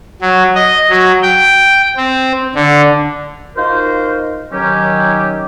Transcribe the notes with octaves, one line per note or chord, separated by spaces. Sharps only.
F#3
D#5
F#3
G5
C4
D3
D#4 F4 F#4 A#4 C5
D#3 F#3 C#4 G4